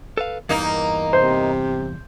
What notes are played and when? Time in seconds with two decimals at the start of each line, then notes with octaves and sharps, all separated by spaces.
0.17 A4 B4 F5
0.49 E2 G2 E3 A#3 D#4
1.13 C3 C5